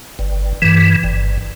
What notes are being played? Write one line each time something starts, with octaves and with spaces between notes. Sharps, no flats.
G1
G2 E3
G1